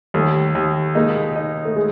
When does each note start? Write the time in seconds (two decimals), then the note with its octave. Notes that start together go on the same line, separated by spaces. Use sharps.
0.14 D#2 G3 A3
0.55 D#2
0.95 G#3 A#3 D#4
1.36 D#4
1.65 A3
1.76 G#3